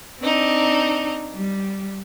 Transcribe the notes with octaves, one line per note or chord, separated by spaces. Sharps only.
C4 D4 D#4
G3